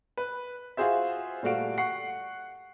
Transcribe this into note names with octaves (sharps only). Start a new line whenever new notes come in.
B4
F4 F#4 G#4 C5 E5
A#2 G3 A3 F#4 F5 D7
F#5 C#6 C7